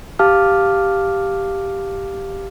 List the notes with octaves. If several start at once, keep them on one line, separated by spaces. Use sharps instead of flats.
G4 F5 A5 D6 F6